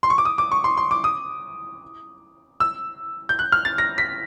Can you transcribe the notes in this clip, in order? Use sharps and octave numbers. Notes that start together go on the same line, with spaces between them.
C6
C#6
D6
D#6
D6
C#6
C6
C6
D6
D#6
E6
G6
F#6
F6
A6
A#6
B6